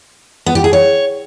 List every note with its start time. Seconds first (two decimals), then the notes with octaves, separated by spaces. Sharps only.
0.46 B3
0.55 G4
0.64 G#4
0.73 C#5